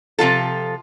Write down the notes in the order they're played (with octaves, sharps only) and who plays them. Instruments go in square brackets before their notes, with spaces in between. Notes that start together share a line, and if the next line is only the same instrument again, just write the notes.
[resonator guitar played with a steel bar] C3 F3 F4 A4